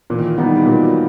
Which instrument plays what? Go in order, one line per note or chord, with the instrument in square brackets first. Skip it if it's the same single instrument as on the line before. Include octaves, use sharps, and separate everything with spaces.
[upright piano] A#2 [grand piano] E3
[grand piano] D#3
E3
[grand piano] F3 [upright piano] G3 B3 D#4
[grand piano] G3
[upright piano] A#2 [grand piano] F#3
[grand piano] F#3